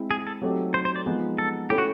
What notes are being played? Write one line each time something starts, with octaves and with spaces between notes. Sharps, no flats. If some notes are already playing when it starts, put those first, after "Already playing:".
Already playing: G#3 C4 E4
G#4
A4
F#3 A3 C4 D#4 G4
C5
C5
D5
F3 G#3 B3 D#4
A4
A3 C#4 E4 G4 A4
F#4